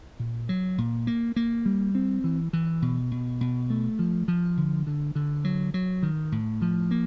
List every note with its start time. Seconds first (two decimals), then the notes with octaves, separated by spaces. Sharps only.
0.19 A#2
0.49 F#3
0.78 A#2
1.07 A#3
1.36 A#3
1.66 G3
1.95 C4
2.24 E3
2.53 E3
2.82 B2
3.12 B2
3.41 B2
3.70 A3
3.99 F3
4.28 F3
4.57 D3
4.87 D3
5.15 D3
5.44 F#3
5.74 F#3
6.03 D#3
6.32 A2
6.62 F3
6.91 A#3